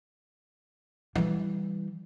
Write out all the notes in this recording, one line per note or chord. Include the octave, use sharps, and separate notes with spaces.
E3 G3